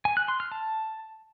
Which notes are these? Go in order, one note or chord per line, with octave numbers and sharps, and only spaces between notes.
G#5
F#6
C6
F6
A5